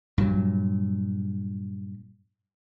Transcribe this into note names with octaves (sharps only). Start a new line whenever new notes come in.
G2 A#2 F#3